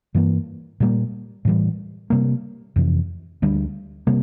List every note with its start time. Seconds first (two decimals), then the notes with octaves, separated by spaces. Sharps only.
0.14 G2 E3 A#3
0.80 A#2 G3 A#3
1.45 A2 E3 G3
2.10 C3 G3 A#3
2.76 F2 C3 E3
3.42 D2 D3 G3
4.07 C3 G3 A#3